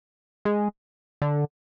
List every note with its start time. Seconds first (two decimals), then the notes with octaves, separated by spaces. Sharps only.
0.45 G#3
1.22 D3